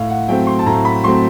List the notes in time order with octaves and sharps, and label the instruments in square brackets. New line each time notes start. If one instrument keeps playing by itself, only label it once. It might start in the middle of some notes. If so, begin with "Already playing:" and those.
Already playing: [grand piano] A2 F5
F#5
F#3 A3 C4 G5
C6
A5
A2 A#5
B5
F#3 A3 C4 C6